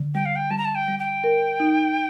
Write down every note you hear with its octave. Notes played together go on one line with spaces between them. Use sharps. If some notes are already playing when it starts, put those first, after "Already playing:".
Already playing: D3
G3 G5
F5
G5
G3 A5
A#5
A5
G5
G3
G5
A#4
D#4